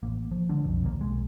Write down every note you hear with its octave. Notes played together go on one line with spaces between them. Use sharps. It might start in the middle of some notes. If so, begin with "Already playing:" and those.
A1 A#3
F3
D3 G#3 D4
B1 F2
A#1 D#2 A#2 A#3
B1 G#3